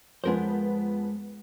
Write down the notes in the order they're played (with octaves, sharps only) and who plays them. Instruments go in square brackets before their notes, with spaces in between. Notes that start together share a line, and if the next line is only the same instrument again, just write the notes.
[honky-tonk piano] F2 F3 B3 [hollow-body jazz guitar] G#3 A#4 C5